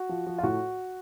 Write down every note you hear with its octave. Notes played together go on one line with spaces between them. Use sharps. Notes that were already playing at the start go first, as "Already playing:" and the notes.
Already playing: F#4
F3
F3
F4
A2 F#4